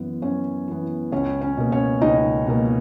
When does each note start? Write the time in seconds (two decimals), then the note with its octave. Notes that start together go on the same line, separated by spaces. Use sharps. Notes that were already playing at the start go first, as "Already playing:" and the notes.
Already playing: F#2 E3 B3
0.22 F#2 C#4 C#5
0.68 E3 B3
1.12 C#2 C#4 C#5
1.41 C#4 C#5
1.57 B2 A#3
1.72 C#4 C#5
2.01 C#2 D#4 D#5
2.46 B2 A#3